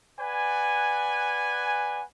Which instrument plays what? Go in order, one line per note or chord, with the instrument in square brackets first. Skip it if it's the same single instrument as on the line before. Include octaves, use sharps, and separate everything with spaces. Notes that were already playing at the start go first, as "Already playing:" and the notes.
[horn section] B4 D5 F#5 G#5